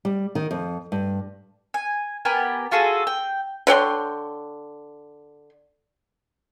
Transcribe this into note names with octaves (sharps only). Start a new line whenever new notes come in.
G3
D#3
F2
G2
G#5
B3 G4 A#4 G#5
F4 F#4 G#4 A4
G5
D3 C#5 G5 C6